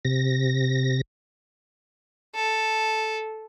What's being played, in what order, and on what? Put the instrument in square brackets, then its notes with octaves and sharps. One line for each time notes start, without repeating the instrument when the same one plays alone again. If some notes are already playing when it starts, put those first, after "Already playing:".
[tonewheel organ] C3 A#6
[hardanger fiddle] A4